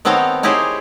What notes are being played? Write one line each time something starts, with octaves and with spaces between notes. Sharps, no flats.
D#3 B3 C4 A4 C#5 A#5
D#4 E4 G4 G#4 C5 C#5